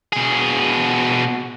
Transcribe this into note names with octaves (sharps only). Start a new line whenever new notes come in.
B2 G#4